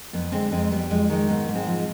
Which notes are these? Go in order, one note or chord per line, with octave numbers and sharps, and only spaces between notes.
F2 B3
D3 G#3 C4
F2 G#3 C4
G3 B3
F2 G#3
D#3 G#3
G#2 B3
G#2
G#3 C4
F3